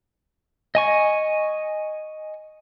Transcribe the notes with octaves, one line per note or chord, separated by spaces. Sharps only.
D#5 G#5 C#6